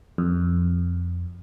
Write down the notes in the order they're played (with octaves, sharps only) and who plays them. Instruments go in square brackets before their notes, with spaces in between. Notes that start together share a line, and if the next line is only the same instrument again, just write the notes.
[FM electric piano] F2